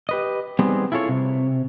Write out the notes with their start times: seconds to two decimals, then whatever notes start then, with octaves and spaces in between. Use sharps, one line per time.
0.09 G4 B4 D#5
0.59 G3 B3 C4 D#4 G#4
0.92 E4 F4 G#4 A4 C#5
1.09 C3